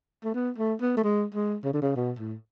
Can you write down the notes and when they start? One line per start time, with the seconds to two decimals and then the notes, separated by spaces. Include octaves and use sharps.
0.24 A3
0.35 B3
0.58 A3
0.81 B3
0.97 A3
1.04 G#3
1.35 G#3
1.64 C#3
1.73 D3
1.82 C#3
1.96 B2
2.19 A2